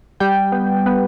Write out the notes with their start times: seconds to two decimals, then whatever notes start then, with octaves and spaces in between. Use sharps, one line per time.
0.20 G3 G5
0.52 B3
0.86 B3